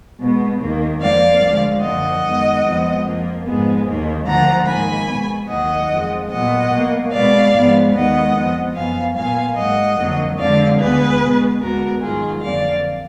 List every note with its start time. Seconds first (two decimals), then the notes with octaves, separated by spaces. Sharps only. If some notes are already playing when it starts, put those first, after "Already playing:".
0.19 B2 G#3 B3
0.60 D#2 D#3 A#3
1.01 F2 F3 A#3 D5 F5
1.42 D2 D3 F3 G#3
1.82 F#2 D3 F3 A#3 D#5 F#5
2.23 F#2 D#3 G#3 B3
2.64 F2 F3 G#3 B3
3.05 F2 F3 A#3
3.45 G#2 F3 G#3 B3
3.86 D#2 D#3 A#3
4.27 D2 D3 F3 A#3 F#5 A#5
4.67 G#2 D#3 A#3 G#5 B5
5.08 B2 G#3 B3
5.49 D#2 D#3 F#3 A#3 D#5 F#5
5.90 F2 F3 G#3
6.31 A#2 F#3 B3 D#5 F#5
6.72 B2 A#3
7.12 B2 G#3 B3 D5 F5
7.53 G#2 F3 G#3 B3
7.94 D#2 D#3 G#3 B3 D#5 F#5
8.35 F2 F3 B3
8.76 F#2 F3 B3 F5 G#5
9.16 A#2 F#3 B3 F5 G#5
9.57 G#2 F#3 A#3 D#5 F#5
9.98 F2 D3 F#3 A#3
10.38 F2 D3 G#3 D5 F5
10.79 D2 D3 G#3 B3 G#4 B4
11.21 B2 G#3 B3
11.61 D2 D3 G#3 B3 F#4 A#4
12.01 G#2 D#3 F#3 F4 G#4
12.42 F2 D3 F#3 A#3 D5 F5